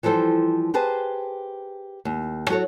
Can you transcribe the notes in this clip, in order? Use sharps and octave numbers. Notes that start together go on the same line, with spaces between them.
E3 F3 G3 A4 C5
G4 G#4 B4 C5 A5
D#2
F#3 F#4 A4 C#5